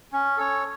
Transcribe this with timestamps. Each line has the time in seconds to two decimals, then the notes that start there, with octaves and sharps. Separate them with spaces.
0.13 C#4
0.37 A4 C#5